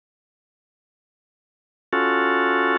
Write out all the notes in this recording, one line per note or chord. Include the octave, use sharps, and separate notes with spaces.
C#4 F4 F#4 A4